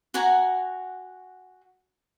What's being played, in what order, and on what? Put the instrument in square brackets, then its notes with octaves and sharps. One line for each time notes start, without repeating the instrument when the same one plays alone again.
[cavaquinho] F#4 F#5 G#5 A#5